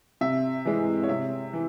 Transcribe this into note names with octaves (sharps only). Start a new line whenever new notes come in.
C3 E5
E3 G#3
C#5
C3 E5
E3